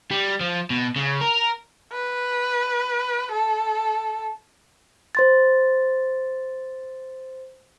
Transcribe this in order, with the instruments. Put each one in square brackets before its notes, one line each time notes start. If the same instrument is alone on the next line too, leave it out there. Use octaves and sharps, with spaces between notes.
[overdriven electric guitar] G3
F3
B2
C#3
A#4
[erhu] B4
A4
[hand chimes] C5 C6 A6